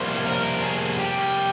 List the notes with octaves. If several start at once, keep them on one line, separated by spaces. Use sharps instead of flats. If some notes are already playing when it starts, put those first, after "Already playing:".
Already playing: F2 C3 G3 A#3 C5
A#4
G#4
G4